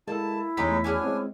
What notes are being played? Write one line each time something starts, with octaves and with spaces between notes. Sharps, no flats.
G#3 A#3 E4 A4 A5
E2 G#3 A3 C#4 D#4 G4 B6
C#4 D4 F#4 G#4 G#5
G#3 C4